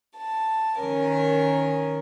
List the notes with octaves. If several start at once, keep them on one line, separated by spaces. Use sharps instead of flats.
A5
D#3 C#4 A#4